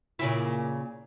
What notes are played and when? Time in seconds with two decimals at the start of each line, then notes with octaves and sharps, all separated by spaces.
0.19 A#2 C#3 E4